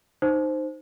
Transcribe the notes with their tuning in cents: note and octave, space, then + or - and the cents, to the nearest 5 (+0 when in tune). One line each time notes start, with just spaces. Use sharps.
D#4 -15 C5 +0